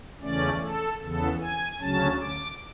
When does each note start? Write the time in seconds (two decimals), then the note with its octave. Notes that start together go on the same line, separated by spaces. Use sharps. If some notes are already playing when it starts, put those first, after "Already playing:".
0.22 E2 C#3 E3 A3 C#4 D5
0.61 A4
1.01 E2 C#3 E3 B3 A4
1.41 G#5
1.80 D2 C#3 F#3 C#4 A5
2.20 D6